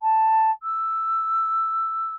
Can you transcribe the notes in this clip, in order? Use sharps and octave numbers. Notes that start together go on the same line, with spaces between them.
A5
E6